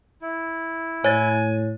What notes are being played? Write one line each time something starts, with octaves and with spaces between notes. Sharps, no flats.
E4
A2 C#5 G#5 A6